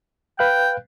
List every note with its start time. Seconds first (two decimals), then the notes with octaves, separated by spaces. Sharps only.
0.39 B4 F5 G5 F#6